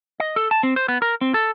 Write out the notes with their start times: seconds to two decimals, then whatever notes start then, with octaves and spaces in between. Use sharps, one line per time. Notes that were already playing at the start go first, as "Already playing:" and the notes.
0.20 D#5
0.36 A4
0.51 A5
0.63 C4
0.76 C5
0.88 B3
1.02 A#4
1.21 C4
1.34 A4